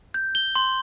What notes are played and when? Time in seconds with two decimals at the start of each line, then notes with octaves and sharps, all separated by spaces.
0.14 G6
0.35 G7
0.55 C6